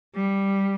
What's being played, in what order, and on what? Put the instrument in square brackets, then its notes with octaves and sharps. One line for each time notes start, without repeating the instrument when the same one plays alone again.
[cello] G3